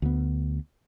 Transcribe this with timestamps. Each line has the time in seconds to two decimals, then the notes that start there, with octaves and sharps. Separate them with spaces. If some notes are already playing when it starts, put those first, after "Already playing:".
0.02 D2 B3